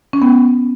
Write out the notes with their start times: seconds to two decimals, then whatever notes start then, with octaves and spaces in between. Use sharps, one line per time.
0.13 C#4
0.22 B3